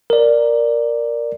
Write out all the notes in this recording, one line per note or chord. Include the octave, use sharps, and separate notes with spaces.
A#4 D5